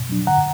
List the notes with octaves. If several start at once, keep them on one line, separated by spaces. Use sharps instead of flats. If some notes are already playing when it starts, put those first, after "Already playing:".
Already playing: B2
F#3 D4
D3 F#5 A#5